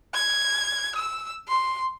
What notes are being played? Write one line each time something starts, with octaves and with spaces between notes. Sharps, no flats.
G#6
E6
C6